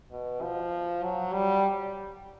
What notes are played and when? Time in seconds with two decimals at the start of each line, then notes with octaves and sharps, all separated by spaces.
0.11 B2
0.42 F3
1.03 F#3
1.33 G3